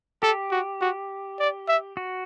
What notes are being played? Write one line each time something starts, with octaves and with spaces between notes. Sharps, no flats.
G4 A4
F#4
F#4
D5
E5
F#4